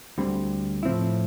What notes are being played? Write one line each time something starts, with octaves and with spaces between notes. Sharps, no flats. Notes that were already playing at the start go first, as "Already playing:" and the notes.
D2 D3 G3 C4
A2 F3 C4 E4